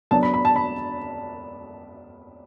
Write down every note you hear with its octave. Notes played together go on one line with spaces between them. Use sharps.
F#3 B3 D4 A5
B5
B5
A5
B5